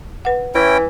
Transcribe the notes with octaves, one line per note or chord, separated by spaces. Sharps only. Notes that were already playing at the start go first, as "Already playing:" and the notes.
B4 F#5
E3 C#4 E4 G5